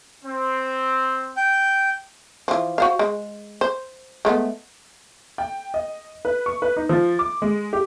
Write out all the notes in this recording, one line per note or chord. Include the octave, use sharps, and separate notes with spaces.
C4
G5
E3 F3
F#4 C5 F5
G#3
C5
G#3 A3 B3
G5
D#5
B4
C#6
B4
D#4
F3
D6
G#3
G4